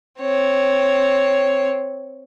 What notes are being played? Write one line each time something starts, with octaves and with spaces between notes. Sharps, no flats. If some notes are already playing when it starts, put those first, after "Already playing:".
C4 C#5